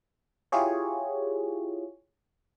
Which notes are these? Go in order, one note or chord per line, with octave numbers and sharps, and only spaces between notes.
E4 F4 G4 G#4 C#5